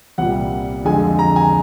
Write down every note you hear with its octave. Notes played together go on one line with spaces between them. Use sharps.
C2 A#2 G3 F#5
F2 D3 F3 G#3 G#5
A#5
G#5